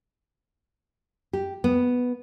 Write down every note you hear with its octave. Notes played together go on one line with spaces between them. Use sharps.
G4
B3